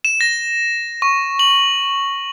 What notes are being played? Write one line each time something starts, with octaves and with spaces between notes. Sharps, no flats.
E7
A#6
C#6
F#7